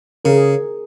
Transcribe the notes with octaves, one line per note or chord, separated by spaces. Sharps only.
C#3 A#4
G#4